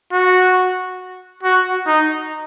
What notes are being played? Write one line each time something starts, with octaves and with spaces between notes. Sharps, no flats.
F#4
F#4
D#4